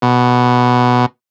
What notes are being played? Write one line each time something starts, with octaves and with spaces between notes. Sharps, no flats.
B2